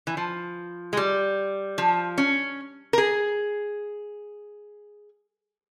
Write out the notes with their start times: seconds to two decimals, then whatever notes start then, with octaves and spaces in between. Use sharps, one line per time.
0.07 E3
0.17 F3
0.93 G#3
0.97 G3
1.78 F3
2.18 C#4
2.93 A#4
2.98 G#4